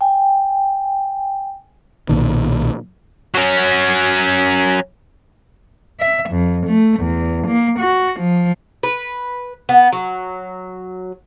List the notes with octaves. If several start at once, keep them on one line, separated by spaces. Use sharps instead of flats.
G5 G#5
B1 A#2 D#3
F#3 C#4
E5
F2
A3
E2
A#3
F#4
F3
B4
B3
F#3